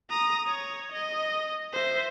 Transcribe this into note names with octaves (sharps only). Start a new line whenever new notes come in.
A#5 D#6
C#5
D#5
C5 E5